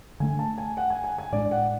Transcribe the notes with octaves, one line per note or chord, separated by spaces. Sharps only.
D3 A3 D4 G#5
A5
G#5
F#5
G#5
G#5
G#5
A2 G#3 D4 D5
F#5